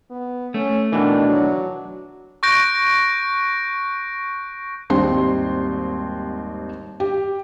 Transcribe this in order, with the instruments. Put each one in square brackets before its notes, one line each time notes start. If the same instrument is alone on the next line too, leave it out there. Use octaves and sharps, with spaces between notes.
[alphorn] B3
[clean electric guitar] A3 [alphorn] C#4
[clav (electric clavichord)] B2 E3 [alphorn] D#3 [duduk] D4
[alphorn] F#3
[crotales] C#6 F#6 G6 A#6 D7
[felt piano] G#1 D#2 G3 C4 C6
G4